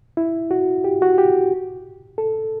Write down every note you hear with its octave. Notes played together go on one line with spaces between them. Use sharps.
E4
F#4
G4
F#4
G4
A4